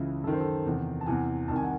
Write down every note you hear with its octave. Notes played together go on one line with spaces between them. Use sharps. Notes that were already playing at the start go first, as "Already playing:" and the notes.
Already playing: C#2 C#3 E3 E4
F#2 D#3 A4
C5
A4
E2 C3 D#3
A5
E2 C3 E3 G#5
C2 C3 D#3 A5
G#5
F#5